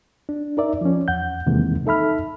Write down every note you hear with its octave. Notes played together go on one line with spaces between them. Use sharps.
D4
D#4 A#4 D5 E5
F3 C#4
E2 F#5 G6
E2 C3 D#3 E3 G#3 A#3
D#4 A4 E5 B5 F6